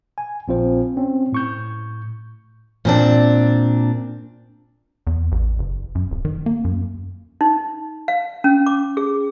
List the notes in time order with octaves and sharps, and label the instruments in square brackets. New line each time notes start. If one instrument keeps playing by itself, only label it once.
[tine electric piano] G#5
A#1 C4 F4 C5
C4 C#4
A2 C#6 G6
[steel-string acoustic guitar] A#2 C4 D4
[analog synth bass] E2
A1
F#1
F#2
D1
D#3
A#3
F#2
[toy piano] D#4
F5
C#4
D6
G#4